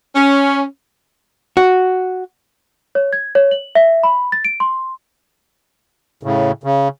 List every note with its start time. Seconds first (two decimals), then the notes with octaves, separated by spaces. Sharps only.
0.15 C#4
1.57 F#4
2.95 C#5
3.13 G#6
3.35 C#5
3.51 F#7
3.75 E5
4.03 B5
4.32 A6
4.45 D7
4.60 C6
6.23 A2 C#3
6.64 C#3